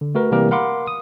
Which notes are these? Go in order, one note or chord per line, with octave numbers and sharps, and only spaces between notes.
D3
A3 F#4 A#4 B4
C3 E3 G3 A#3 G4 A#4
A#4 F5 F#5 B5 C6 D6
D#6